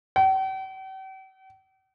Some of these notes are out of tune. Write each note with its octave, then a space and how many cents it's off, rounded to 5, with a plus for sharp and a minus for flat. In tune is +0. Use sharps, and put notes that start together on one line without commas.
G5 -45